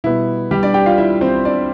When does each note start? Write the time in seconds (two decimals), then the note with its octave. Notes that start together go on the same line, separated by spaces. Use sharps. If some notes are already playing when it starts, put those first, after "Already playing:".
0.04 B2 G3 B3 E4
0.51 G3 G4
0.63 D4 D5
0.74 G4 G5
0.86 F4 F5
0.98 E4 E5
1.21 C4 C5
1.45 D4 D5